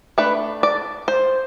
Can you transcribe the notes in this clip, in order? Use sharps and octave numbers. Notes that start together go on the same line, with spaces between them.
A3 D4 B4
D5
C5